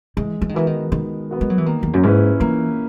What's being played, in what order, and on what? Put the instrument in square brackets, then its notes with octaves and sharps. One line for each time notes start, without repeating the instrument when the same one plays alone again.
[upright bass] E3 [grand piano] G#3
[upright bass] E3
D#3
[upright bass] E3 [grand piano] B3 F#4 A#4
[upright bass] D#3
[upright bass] D#3 [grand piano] G#3
[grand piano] B3 F#4 A#4
[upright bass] G#3
F#3
E3
[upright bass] D#3 [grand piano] A#3
[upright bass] E2
F#2
[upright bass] G#2 [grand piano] C#4 E4 B4
[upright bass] E3 [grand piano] A#3